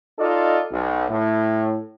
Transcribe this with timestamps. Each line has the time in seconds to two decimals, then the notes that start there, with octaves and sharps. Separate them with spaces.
0.19 D#4 F4 A4 D5 D#5
0.71 B1
1.09 A2